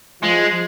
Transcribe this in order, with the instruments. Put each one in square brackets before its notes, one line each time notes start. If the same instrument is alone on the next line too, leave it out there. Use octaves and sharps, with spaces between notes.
[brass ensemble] F3 [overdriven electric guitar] G#3